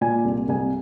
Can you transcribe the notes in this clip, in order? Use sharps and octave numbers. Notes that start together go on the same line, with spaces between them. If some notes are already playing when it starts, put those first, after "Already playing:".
A#2 G#5
C2
C2 G#5